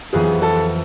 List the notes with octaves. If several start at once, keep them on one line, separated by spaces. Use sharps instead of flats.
F2 E3 B3 F4 G#4 B4
A4